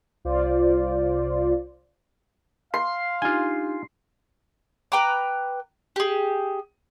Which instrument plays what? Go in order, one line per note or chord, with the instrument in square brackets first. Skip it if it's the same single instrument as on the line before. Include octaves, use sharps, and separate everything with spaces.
[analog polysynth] C2 F4 C5 D5
[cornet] F5 [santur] C6
[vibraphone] D4 D#4 G4 [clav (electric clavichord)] F4 G#5
[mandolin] B4 G5 A#5 D6
G4 G#4